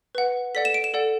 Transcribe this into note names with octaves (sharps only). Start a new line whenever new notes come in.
B4 F#5
A4 D5 F#5 B6
E7
D7
E7
A4 D5 F#5